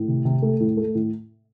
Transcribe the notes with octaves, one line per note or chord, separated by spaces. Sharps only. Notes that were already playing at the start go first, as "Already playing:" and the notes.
Already playing: A2
C3
C3
A3
A2
A3
A2